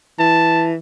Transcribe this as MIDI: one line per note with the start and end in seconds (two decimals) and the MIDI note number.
0.19 0.76 52
0.19 0.69 81